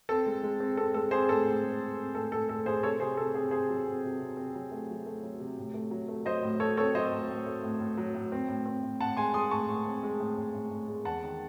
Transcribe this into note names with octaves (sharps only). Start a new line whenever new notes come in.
C4 A4
G#3
G#3
C4
C4 A4
G#3 A4
C4 G#4 C5
A2 A4
A2
G#3
G#3
C4
A2 A4
A2 A4
A2 A4
A2 G#4 C5
C3 A4 C#5
C3 G#4 C5
C3 A4
C4 G#4
C4 G#4 C5
F#3
C4
C3
C3
C4
F#3
A3
F#3
A3
F#3
C3
A2
A3
F#3
A3
F#3 C5 D#5
A2
F#3 A4 C#5
C4 A4 C#5
F#3 C5 D#5
A2
A2
A3
A2
A2
F#3
A2
C4
A2
C4
A2
A2 F#5 A5
G#3 G#5 C6
G#3 C6 D#6
A2 A5 C#6
A2
C4
G#3
A2
A2
A2
A2
G#3
E2 F#5 A5
D#3